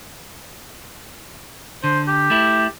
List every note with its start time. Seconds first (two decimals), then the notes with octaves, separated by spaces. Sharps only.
1.84 D3 C5
2.08 G4
2.30 A3 E4